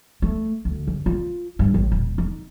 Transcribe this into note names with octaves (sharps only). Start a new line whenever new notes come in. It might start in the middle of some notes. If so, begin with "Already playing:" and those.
A3
D2
F#2
F4
G2
A1
D#1
D#4